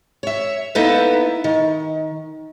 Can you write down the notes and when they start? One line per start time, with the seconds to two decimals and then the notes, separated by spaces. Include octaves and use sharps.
0.23 C#5 E5
0.75 A#3 B3 D#4 E4 A4 B4
1.44 D#3